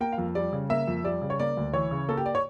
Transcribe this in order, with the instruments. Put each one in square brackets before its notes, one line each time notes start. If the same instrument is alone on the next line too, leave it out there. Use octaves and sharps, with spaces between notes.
[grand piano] A#3 G5
F5
F2
G3 D5
C#3
A#3 E5
F2
G3 D5
C#3
C#5
A#3 D5
D2
E3 C#5
C#3
A#3 A4
G4
D5
C#5